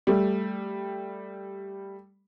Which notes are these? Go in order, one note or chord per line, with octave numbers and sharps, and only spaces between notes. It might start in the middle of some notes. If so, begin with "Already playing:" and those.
G3 A3